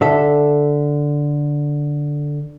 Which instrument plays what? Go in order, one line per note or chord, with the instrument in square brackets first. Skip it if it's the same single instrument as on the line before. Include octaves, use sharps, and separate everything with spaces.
[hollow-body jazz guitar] D3 A4 E5